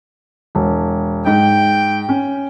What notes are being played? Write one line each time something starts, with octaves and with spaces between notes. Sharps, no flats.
E1
G#2 G5
C#4